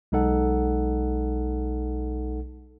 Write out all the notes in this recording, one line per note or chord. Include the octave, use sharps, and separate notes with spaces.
B1 G#3 D#4 A4 F#5